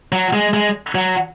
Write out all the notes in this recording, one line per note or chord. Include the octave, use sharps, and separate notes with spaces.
F#3
G#3
G#3
F#3